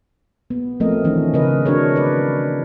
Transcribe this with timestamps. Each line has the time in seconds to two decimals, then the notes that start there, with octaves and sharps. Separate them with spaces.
0.50 B3
0.80 F3 A3 C4 A#4 D#5
1.04 D#3 E3 A3 C#4 D4
1.34 C#3 A#4 B4 D#5
1.66 D4 F#4 A#4 C#5
1.96 B4 D5